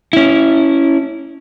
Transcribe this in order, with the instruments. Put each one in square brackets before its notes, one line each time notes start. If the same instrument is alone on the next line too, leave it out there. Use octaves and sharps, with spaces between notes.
[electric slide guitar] C#4 E4